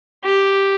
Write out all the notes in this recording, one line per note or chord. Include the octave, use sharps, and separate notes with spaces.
G4